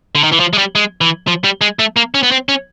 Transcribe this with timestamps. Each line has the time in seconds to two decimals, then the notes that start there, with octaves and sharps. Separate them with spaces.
0.15 D3
0.23 D#3
0.32 E3
0.40 F3
0.53 G#3
0.58 G3
0.75 G#3
1.01 E3
1.27 F3
1.44 G3
1.61 G#3
1.79 A3
1.96 A#3
2.14 C#4
2.23 B3
2.31 C4
2.49 C#4